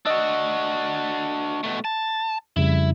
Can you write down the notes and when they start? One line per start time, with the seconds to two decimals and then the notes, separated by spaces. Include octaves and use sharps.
0.06 D4 F#4 D#5 E6
1.64 B2 A3
1.85 A5
2.56 F2 C#3 G3 E4